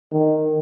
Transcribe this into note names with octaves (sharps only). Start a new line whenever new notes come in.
D#3